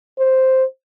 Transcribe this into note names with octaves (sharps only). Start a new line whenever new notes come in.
C5